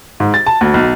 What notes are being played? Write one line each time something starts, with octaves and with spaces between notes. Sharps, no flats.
G#2
A6
A5
D2
B1